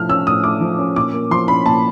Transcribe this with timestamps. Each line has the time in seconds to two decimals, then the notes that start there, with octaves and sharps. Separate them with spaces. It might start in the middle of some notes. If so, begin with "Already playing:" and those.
Already playing: A2 F3 A3 F6
0.09 C#4 E6
0.27 A2 D#6
0.44 A3 D6
0.61 F3
0.79 C#4
0.96 A#2 D6
1.13 A#3
1.31 F3 C6
1.48 C#4 B5
1.66 A#2 A5